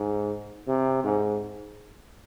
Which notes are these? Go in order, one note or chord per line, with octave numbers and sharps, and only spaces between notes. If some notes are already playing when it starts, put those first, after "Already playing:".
Already playing: G#2
C3
G#2